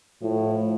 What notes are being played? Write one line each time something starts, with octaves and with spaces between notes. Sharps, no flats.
A2 F3